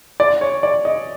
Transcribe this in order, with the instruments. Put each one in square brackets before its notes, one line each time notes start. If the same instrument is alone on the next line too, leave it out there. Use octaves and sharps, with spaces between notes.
[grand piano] D5
C#5
D5
D#5